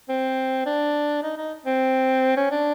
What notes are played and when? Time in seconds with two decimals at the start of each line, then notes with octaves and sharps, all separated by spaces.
0.09 C4
0.66 D4
1.23 D#4
1.37 D#4
1.66 C4
2.37 C#4
2.51 D4